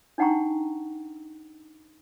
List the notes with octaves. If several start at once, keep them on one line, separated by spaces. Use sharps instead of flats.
D4 D#4 F#5 G5 A#5 C#6